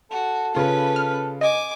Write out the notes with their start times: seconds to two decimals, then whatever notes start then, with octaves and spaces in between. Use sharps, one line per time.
0.11 F#4 A4
0.55 C#3 C#4 F4 B4
0.96 F6
1.41 D#5 G#5 D6